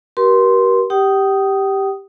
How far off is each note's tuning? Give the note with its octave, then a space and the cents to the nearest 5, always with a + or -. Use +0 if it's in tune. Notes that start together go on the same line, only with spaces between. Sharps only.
G4 -45 A#4 +40 C6 -5
G4 +0 G5 -35 D#6 +0